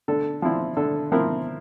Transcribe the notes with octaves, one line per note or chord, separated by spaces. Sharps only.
D3 A4
F3 C4 E4
D3 A4
F3 C4 E4 A#4